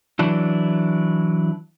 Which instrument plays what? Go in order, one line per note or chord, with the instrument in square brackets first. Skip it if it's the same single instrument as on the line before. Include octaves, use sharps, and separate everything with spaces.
[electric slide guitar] E3 F#3 D4 E4